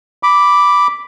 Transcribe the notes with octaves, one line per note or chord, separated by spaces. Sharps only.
B5 D6